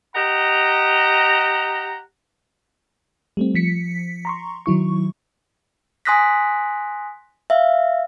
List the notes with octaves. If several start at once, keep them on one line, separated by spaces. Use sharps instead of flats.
G4 D#5 F#5 A#5
G3 A3 C4
F3 B6 C#7
A#5 C6 C#6
D#3 F#3 E4 C#6
G#5 C6 D#6 F#6 A#6 B6
E5 F5